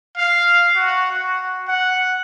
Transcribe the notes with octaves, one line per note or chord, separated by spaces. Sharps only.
F5
F#4
F#4
F#5